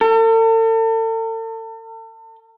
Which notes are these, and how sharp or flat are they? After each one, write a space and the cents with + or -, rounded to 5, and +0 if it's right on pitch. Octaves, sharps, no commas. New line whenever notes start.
A4 +40